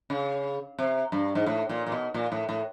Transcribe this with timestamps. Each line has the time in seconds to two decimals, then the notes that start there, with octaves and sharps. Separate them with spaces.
0.10 C#3
0.79 C3
1.12 G2
1.35 G#2
1.46 A2
1.69 A#2
1.87 A#2
1.92 B2
2.14 A#2
2.32 A2
2.49 A2